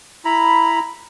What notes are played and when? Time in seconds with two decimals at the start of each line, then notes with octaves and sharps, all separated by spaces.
0.25 E4 A#5 B5